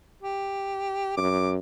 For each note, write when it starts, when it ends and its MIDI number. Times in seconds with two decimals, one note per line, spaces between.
0.23 1.17 67
1.17 1.58 42
1.17 1.51 86